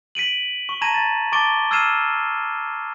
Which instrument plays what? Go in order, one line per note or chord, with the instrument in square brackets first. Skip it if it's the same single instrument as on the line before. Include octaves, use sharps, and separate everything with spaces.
[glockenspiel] B6 D7 D#7 F#7
C#6
A5 A#5 G#6 A#6 D#7 E7
A6
A5 C#6 D6 A6 D7 G7
E6 F6 G#6 C7 D#7 E7